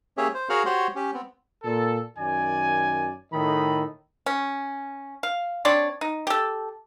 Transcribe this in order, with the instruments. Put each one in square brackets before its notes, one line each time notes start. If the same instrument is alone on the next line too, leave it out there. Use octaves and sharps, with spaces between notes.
[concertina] A#3 C#4 G4 G#4 C#5 E5
C5
F#4 G#4 A#4 C#5 F5 F#5
F#4 G4 C5 C#5 F#5 C6
C#4 G4
B3 C4
[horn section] A#2 A4
F#2 D#3 D5 G#5
A2 D#3 A4 D#5 B5
[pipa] C#4
F5
C4 D4 C#5 D5
D#4
G4 A4